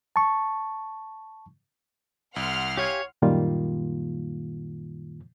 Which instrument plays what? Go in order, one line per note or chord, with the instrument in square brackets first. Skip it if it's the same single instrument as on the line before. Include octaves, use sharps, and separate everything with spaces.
[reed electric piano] A5 C#6
[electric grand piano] C2 [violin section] F#5 C6 F6
[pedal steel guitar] G4 F5 G#5 [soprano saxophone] C#5
[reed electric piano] F#2 A#2 D#3 G3 A#3 F4